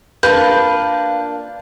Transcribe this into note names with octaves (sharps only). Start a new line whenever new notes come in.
A#3 D4 F4 B4 G6